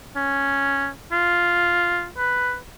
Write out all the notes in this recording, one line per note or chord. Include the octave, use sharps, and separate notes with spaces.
C#4
F4
B4